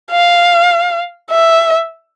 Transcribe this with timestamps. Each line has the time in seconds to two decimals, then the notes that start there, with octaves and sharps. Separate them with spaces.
0.11 F5
1.31 E5